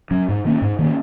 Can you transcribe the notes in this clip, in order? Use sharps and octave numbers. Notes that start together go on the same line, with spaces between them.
F#3 C#4
G#2
D#3 A#3 C#4
G#2
D#3 A#3 C#4